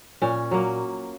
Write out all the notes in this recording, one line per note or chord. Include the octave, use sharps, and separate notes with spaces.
A#2 C#4
F#3 A#3